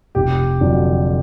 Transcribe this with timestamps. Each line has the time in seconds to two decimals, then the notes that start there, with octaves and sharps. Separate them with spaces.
0.15 F1 G4
0.61 F2 D3 F#3